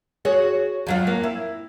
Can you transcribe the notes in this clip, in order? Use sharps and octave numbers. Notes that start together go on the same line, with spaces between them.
F#4 G#4 C#5
F2 F#3 F4
A#3
E4